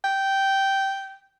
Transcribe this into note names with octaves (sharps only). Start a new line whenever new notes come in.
G5